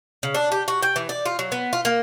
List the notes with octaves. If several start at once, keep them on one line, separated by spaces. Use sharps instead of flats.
C#3
D4
G4
F#4
G5
E3
D5
F4
F#3
B3
F4
A#3